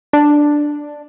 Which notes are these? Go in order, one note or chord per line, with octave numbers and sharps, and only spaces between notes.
D4